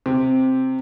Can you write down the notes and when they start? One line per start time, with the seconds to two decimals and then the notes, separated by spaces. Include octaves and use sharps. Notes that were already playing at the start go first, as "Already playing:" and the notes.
0.06 C3